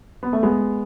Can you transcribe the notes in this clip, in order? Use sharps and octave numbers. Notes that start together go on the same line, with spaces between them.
B3
A3
G#3 B3